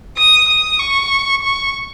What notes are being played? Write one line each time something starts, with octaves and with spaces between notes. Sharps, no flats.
D#6
D#6
C#6
C#6